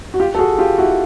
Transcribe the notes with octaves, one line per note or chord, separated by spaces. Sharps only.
F#4
F4 G4
A4
F#4 G#4
F4 G4
E4 F#4